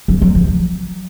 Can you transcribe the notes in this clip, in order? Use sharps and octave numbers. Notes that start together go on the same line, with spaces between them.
F#3
F#3
F3
F#3